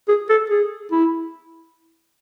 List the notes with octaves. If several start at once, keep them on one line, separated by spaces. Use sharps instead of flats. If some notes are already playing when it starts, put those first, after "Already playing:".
G#4
A4
G#4
E4